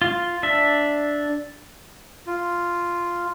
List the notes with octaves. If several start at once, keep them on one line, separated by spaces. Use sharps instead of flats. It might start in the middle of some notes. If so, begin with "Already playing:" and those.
F4
D4 E5
F4